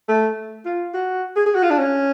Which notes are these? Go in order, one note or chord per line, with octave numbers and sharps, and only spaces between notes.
A3
F4
F#4
G#4
G#4
F#4
F4
D4
C#4